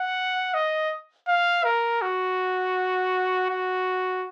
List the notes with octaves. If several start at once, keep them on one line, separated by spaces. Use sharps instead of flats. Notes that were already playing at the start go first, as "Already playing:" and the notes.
Already playing: F#5
D#5
F5
A#4
F#4
F#4